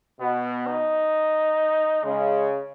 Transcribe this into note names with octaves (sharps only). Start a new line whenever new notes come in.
B2 B3
D#4
C#3 G#3